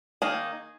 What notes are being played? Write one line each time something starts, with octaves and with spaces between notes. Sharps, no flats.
D#3 A#3 D#4 G#4